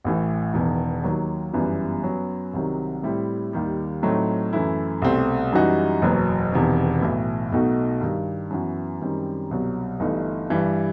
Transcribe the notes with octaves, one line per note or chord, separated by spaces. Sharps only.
A1 A2 E3
E1 E2 D#3
D#2 D#3 F#3
G1 F#2 E3 G3 B3
F#2 F#3 B3
C2 C3 D#3 F#3
A2 G3 C4 E4
D#2 D#3 G3
A2 F#3 A3 C4 D#4
F#2 E3 A3 E4
C2 B2 A3 C4
F#2 E3 G3 D#4 F#4
F#1 E2 B2 F#3 B3
E1 E2 C3 D#3
B1 A2 E3
B1 B2 A3 D#4 F#4
G2 D#3 G3
F#2 E3 B3 F#4
F#2 D#3 G3 C4
C2 B2 F#3
G1 G2 E3 A3 D#4
G2 E3 G3